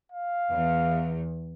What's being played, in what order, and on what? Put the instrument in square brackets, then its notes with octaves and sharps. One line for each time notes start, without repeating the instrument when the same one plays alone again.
[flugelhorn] F5
[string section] E2